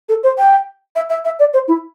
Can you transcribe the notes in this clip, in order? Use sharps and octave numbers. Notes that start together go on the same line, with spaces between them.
A4
C5
G5
E5
E5
E5
D5
C5
E4